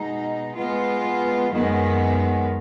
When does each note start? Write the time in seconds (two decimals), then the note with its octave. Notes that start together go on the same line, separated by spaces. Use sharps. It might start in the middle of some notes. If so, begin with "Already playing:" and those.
Already playing: B2 G#3 D#4
0.55 G#3 B3 F4
1.50 F#2 D#3 G#3 B3